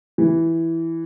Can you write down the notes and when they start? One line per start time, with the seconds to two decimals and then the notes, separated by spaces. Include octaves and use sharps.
0.18 E3